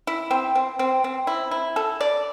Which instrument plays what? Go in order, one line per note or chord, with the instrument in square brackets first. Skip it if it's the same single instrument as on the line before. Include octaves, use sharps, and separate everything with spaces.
[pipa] E4
C4
C4
C4
C4
E4
E4
A4
D5